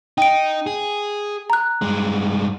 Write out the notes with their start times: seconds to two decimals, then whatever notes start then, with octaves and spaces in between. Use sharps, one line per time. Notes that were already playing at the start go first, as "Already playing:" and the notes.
0.18 D#4 G5 D7
0.67 G#4
1.50 A#5 F#6
1.82 G2 G#3